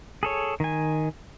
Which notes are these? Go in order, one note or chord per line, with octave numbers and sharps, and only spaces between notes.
G#4 A4 C#5
D#3 G#5